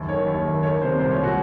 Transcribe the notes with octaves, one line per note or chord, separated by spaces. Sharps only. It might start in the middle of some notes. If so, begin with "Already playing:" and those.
Already playing: F#1 D#2
D#3 C#5
D#2
D#3
D#3 C#5
C3 C5
C2 C5
C#5
C2
F#4